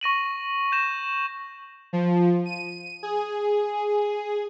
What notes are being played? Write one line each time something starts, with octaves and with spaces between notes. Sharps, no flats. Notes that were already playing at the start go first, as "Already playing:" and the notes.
C#6 A#6 D#7 F#7
G6 A#6 E7
F3
D#7
G#4